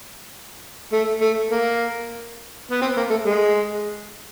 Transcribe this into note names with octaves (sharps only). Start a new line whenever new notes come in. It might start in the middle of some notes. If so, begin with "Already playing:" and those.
A3
A3
A#3
B3
C4
A#3
A3
G#3